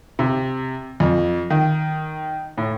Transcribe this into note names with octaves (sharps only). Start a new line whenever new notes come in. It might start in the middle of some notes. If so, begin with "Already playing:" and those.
C3
F2
D#3
A2